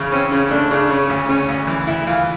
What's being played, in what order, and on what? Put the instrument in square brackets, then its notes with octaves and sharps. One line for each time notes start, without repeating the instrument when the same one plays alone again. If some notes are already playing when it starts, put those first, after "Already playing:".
Already playing: [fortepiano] C#3 E3
[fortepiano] C4 [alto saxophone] C#4
[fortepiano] C#3 [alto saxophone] C#4
[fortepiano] A3 [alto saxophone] D4
[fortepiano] C#3 [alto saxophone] D4
[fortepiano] C#3 [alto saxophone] C#4
[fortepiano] D2
[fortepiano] C#3 [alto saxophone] C#4
[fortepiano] D2
E3
[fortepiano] D2 [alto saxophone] E4
[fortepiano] E3 [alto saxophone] F4